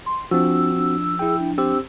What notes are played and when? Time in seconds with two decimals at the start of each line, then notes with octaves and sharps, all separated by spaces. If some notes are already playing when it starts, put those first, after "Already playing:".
0.06 C6
0.31 F3 C4 D4 F#4 E6
0.77 D4
1.19 E4 G#4 G5
1.39 D4
1.58 C4 G4 C5 E6